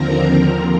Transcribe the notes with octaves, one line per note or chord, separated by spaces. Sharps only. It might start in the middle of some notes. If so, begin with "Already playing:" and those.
Already playing: D#2 D3 F3 C4 A#4 A#5